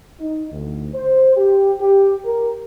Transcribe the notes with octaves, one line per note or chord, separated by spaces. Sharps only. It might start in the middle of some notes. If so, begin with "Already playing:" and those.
D#4
D2
C5
G4
G4
A#4